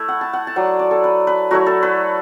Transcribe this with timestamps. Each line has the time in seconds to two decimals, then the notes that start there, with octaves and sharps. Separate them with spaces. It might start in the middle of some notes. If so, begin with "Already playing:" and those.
Already playing: A3 E4
0.09 F#5
0.21 A5
0.33 F#5
0.47 A5
0.56 F#3 D4 F#5
0.79 D5
0.91 A4
1.04 B4
1.27 B4
1.51 F#3 A3 E4 F#4
1.66 A4
1.83 B4